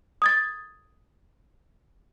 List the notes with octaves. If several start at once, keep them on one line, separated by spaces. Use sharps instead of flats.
D#6 G#6 A6